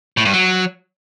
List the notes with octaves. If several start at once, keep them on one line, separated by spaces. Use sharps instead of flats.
A2
G2
F#3